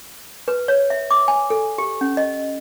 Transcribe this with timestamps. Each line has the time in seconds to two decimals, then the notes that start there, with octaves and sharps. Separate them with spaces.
0.48 B4
0.68 C#5
0.90 E5
1.11 D6
1.28 G#5
1.50 A4
1.78 G4
2.01 C#4
2.17 D#5